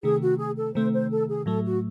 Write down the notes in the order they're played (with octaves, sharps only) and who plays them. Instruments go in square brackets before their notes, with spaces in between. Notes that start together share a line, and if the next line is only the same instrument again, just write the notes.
[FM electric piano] C3 D#3 A3 [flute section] G#4
[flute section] F#4
G#4
A4
[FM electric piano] C3 D#3 A3 [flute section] C5
[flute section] C5
A4
G#4
[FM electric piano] A2 F#3 A3 [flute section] A4
[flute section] F#4